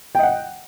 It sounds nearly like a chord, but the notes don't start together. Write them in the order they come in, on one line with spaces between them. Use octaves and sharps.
G5 D#5 F#5